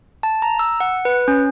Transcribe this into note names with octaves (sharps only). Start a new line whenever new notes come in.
A5
A#5
E6
F#5
B4
C#4